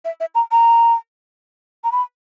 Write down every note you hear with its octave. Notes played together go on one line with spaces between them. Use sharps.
E5
E5
A#5
A#5
A#5
B5